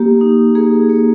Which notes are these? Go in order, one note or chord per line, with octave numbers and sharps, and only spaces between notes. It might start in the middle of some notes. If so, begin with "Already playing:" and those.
Already playing: A#3 G4
D#4
A#3 G#4
A#3